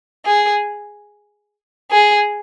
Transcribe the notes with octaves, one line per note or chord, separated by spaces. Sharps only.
G#4
G#4